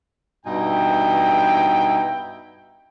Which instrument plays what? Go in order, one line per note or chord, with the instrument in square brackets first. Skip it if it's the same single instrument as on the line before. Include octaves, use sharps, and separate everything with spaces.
[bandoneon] G2 B2 D#4 [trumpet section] E4 G5